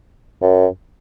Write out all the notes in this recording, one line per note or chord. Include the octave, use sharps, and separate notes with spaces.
F#2